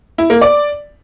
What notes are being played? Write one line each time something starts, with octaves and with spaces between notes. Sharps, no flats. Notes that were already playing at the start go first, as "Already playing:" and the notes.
E4
A#3
D5